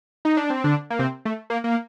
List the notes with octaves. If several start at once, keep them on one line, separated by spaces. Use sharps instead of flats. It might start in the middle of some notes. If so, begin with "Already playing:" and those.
D#4
D4
C4
D3 D4
A#3
C3 C4
A3
A#3
A#3